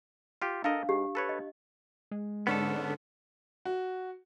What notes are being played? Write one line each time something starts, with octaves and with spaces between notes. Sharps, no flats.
F4 G4
D4 A4 A#4 D#5 F5
G#2 G4
A4 B4 C#5
D#5
G#3
G#2 D3 B3 C#4 A4
F#4